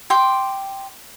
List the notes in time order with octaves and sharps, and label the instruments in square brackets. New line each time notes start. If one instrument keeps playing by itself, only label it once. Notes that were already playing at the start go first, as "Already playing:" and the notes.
[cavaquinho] G5 C6 D6